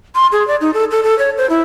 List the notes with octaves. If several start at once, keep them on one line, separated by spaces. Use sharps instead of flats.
C6
G#4
D5
D#4
A4
A4
A4
C#5
C5
E4